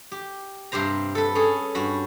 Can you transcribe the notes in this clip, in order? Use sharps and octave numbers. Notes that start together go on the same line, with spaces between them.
G4
G2 C3 G4 C5 A#5
A4 B4
C#4 G#4 A4
G2 F#4 B5